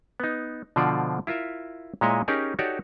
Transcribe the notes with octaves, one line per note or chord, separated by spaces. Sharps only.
B3 D#4
B2 D3 F3 F4 C5 D5
E4 F4 A#4 E5
A#2 G#3 E4 C#5 D#5 G#5
C#4 D#4 G4 G#4 A#4
D#4 F#4 G4 A4 C#5 D5